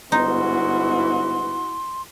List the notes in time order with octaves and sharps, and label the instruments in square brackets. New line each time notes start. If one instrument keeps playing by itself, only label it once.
[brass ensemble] G1 G#2 B3 [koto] D#4 [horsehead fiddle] E4 F#4 [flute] C6